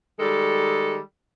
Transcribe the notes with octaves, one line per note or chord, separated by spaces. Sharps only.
D#3 G3 G#3 A4